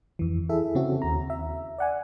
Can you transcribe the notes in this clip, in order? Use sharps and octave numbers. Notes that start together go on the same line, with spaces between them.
F2 E3
E4 G#4 A4 E5
C#3 C4 C#4 F#4
D#2 A#5
E5
D5 F#5 G#5